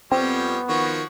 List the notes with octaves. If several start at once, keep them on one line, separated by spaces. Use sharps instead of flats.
F2 F3 G3 B3 C4 C#5
D#3 F3 F#4 C#5